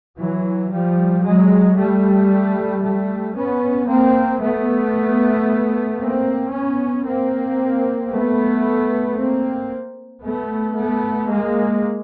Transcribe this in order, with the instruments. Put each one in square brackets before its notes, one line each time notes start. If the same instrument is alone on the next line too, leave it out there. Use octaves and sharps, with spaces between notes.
[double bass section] E3 F#3
F3 G3
F#3 G#3
G3 A3
G3 A3
B3 C#4
A#3 C4
A3 B3
A#3 C4
B3 C#4
A#3 C4
A3 B3
A#3 C4
A3 B3
A3 B3
G#3 A#3